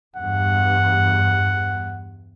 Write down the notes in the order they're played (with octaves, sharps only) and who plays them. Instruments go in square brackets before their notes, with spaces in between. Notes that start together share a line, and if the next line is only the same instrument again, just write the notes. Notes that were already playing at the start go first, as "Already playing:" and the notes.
[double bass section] E2 G2 [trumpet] F#5